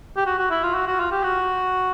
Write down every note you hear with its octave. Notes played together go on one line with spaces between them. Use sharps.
G4
F#4
F#4
E4
F4
F#4
F#4
F4
G4
F#4